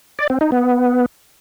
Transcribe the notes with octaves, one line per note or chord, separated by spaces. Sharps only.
D5
C4
D#4
B3